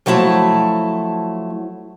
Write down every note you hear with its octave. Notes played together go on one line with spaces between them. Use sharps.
F3 F#3 A3 E4 A5